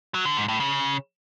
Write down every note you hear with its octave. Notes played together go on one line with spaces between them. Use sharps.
F#3
D3
G#2
A2
C#3